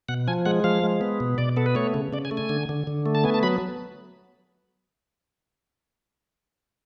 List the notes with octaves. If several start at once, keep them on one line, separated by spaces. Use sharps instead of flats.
B2 F#5
F3 G#5
G#3 F#5
F3 F5
G#3
B3
B2
B2 D5
B3 A4
B4
A3 C#5
C#3
C#3 D5
G#5
A3
G#5
D3
D3
D3
A3
A5
B3 G#5
A5
F#3 B5